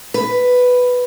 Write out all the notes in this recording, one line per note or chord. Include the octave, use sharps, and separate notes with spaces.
B4